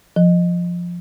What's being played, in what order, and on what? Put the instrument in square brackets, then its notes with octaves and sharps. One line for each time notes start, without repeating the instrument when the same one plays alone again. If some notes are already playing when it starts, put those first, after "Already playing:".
[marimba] F3